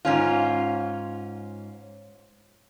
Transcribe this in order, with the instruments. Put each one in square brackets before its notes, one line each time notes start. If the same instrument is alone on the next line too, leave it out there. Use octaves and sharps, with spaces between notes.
[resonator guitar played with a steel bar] G#2 C#4 F4